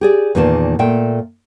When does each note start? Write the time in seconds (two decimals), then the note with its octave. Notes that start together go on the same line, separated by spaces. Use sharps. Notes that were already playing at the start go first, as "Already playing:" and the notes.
0.01 G4 G#4 D5
0.35 E2 A#2 D#3 A#3 A5
0.79 A#2 A3 E5 G5